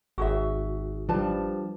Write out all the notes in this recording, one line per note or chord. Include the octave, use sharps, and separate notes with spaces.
G#1 F#4 G#4 E5
F3 G3 D4 B4 A5